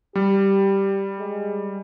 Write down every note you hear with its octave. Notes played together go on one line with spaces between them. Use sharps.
G3 G4
G#3